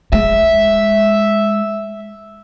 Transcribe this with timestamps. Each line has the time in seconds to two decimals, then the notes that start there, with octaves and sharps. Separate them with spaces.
0.13 G#3 E5